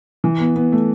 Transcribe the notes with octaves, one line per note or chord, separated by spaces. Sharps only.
E3
B3
B3
A3